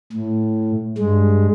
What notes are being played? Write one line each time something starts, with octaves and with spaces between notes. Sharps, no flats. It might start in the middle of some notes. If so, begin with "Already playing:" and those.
A2
G2 G#3